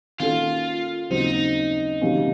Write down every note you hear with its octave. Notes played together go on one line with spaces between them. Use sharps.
D#3 A#3 C#4 F4 F#4 A4
D#2 C#3 F#3 C4 D#4
C3 D#3 F#3 A#3 C#4